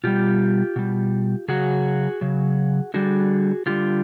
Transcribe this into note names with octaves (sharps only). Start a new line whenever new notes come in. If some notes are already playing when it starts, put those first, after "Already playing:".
B2 G3 F4 G4
B2 G3
C#3 F#3 F#4 G#4
C#3 F#3
D3 G3 F#4 G#4
D3 G3 F4 G4